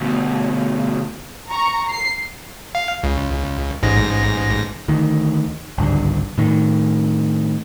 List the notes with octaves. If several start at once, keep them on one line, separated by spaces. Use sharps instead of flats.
D2 B2
A#5 C#6
C7
F5
C#2
A1 G#2 A#6
D2 D#3
G#1 C#2 G2 D3
A2 D#3